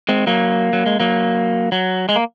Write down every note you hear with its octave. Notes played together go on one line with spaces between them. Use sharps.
G#3 C4
F#3 A#3
F#3
G#3
F#3 A#3
F#3
G#3
A#3